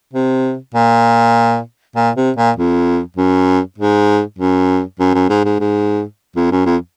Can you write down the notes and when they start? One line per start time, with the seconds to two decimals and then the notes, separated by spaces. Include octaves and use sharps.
0.13 C3
0.74 A#2
1.96 A#2
2.16 C3
2.37 A#2
2.57 F2
3.17 F#2
3.78 G#2
4.39 F#2
5.00 F#2
5.14 F#2
5.30 G#2
5.45 G#2
5.60 G#2
6.36 F2
6.51 F#2
6.66 F2